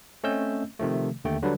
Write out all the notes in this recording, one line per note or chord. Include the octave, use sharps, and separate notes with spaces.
A3 C4 C#4 D#5 E6 G6
C3 D#3 F3 A3
D#2 D3 A3 G5
D3 F#3 G3 D4 B4